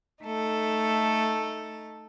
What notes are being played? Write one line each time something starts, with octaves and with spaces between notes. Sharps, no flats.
A3 D#4 A4